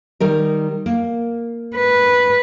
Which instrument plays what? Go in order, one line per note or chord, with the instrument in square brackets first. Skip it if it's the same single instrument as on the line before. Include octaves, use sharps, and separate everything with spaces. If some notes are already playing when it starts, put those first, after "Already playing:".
[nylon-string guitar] D#3 G3 A#4
A#3
[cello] B4